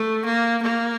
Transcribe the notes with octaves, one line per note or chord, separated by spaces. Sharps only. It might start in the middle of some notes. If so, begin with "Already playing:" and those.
Already playing: A3
A#3
A#3